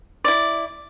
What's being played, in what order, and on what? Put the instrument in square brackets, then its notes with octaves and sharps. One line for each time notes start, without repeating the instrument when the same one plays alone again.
[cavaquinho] E4 D5